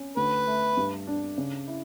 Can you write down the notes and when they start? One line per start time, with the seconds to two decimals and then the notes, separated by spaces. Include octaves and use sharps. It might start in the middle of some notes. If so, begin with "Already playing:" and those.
Already playing: C#4
0.16 D2 B4
0.47 A3
0.77 G2
1.07 D4
1.38 C#3
1.68 E4